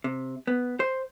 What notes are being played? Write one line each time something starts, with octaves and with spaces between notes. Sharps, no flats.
C3
B3
C5